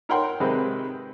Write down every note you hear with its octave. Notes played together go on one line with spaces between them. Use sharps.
D#4 A#4 C#5 F#5 G5 C6
C3 D#3 G#3 C4 B4